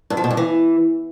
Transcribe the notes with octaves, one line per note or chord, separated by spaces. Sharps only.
G2
F3
B2
G2
E3